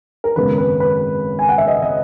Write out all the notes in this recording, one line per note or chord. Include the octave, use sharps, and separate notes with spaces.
A#4
G#1 F#2 C#3 G#3 B3 B4
B4
B4
G#5
F#5
E5
D#5
D#5